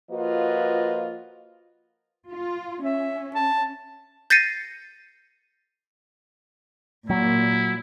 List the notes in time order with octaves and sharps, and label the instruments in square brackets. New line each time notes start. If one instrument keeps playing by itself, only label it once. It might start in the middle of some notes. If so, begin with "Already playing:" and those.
[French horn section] F3 A#3 F4 F#4 B4 D#5
[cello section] F4
[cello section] C#4 [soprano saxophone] E5
[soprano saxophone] A5
[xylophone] G6 A6 A#6 C7 C#7 D#7
[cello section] A#2 [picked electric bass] F#3 [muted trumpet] E4